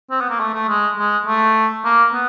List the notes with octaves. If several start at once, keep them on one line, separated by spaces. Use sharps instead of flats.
C4
B3
A#3
A3
A3
G#3
G#3
A3
A#3
B3